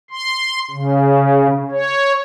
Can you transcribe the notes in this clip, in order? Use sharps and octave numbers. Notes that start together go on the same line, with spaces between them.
C6
C#3
C#5